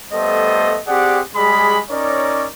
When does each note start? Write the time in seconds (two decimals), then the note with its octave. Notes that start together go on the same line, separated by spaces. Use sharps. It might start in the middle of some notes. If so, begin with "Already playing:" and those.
0.13 G3 A3 B3 A4 C5 D#5
0.88 C4 G4 G#4 D5 F#5
1.35 G3 G#3 G#4 B5
1.91 C#4 D#4 A#4 C#5 D5